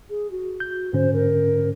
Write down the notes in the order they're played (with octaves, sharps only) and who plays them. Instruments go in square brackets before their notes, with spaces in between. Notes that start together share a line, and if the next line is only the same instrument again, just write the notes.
[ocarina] G#4
F#4
[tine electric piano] G6
[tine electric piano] G#2 D3 C#4 [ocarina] C5
[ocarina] A#4